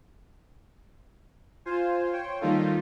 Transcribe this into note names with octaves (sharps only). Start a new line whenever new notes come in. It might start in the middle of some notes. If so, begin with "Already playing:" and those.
F4 C5 G#5
C5 C#5 G5
D#3 G3 A#3 D#4 F4 A4